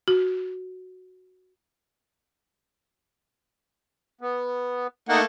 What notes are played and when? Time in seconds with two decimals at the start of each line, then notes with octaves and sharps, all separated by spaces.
0.08 F#4
4.21 B3
5.09 A3 A#3 D#4 F#5